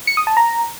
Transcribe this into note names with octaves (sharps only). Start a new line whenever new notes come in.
C#7
D#6
A5
A#5